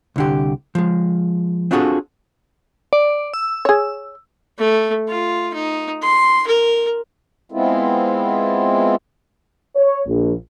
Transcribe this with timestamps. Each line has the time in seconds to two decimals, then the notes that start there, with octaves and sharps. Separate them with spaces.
0.16 C2 D3 G4
0.75 F3 G#3
1.71 C4 D4 F4 F#4 G#4 A4
2.93 D5
3.34 E6
3.65 G#4 C#5
4.58 A3
5.09 F4
5.54 D#4
6.02 C6
6.47 A#4
7.52 G#3 B3 C4 E4 F4
9.76 C#5
10.07 A#1